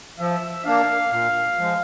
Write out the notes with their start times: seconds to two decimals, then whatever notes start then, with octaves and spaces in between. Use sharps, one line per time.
0.19 F3 E5
0.65 A#3 D4 F5
1.11 A#2 F5
1.58 F3 G#3